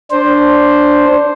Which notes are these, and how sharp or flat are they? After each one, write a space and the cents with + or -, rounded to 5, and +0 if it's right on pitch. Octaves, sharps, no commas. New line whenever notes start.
D4 +0 C5 +0